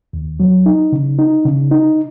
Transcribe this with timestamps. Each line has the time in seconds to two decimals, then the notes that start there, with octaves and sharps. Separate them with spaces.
0.13 D#2
0.40 F#3
0.66 D#4
0.92 C#3
1.19 D#4
1.45 C#3
1.71 D#4